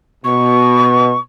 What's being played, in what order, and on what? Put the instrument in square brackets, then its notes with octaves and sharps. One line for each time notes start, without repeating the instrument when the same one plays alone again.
[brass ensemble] B2 [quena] C#6